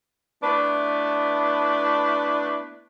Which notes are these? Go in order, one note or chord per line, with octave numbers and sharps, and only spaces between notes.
A3 B3 D4 E4 B4